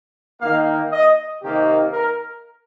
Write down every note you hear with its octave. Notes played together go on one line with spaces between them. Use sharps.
D#3 A#3 D#4 F5
D#5
C3 D#3 A#3 D#4 G4
A#4